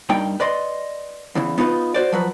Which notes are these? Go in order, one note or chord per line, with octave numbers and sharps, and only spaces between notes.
G2 A#3 D#4 G5
B4 D5 D#5 C6
E2 C#3 E3
B3 D#4 F4 B4
F#4 C5 D5
F3 F#3 B4